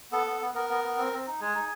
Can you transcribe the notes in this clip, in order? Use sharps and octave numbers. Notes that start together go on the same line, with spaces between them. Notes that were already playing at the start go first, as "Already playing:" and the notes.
B3 A4
B3
B3
B3 A#4
B3
B3
C4
C4
D#4
G#3 G#4
D#4